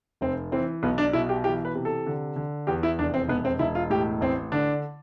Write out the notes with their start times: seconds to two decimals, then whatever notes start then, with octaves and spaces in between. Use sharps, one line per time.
0.21 F1 C4
0.52 E3 C4
0.83 B1 B3
0.98 D4
1.13 B2 E4
1.29 G4
1.44 E3 G4
1.65 B4
1.75 C3
1.85 A4
2.07 D3
2.36 D3
2.67 E2 G4
2.83 E4
2.99 F1 D4
3.14 C4
3.28 E1 B3
3.45 C4
3.59 E1 E4
3.75 F4
3.90 A2 G4
4.21 A1 C4
4.52 D3 D4